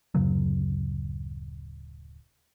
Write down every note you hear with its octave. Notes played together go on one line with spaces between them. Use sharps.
D1 F#2 C#3 F#3